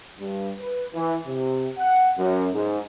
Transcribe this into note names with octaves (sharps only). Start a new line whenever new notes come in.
G2
B4
E3
C3
F#5
F#2
G#2